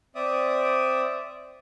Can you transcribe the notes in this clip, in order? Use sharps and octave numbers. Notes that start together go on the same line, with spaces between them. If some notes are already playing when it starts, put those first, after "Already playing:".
C4 D5 E5 D#6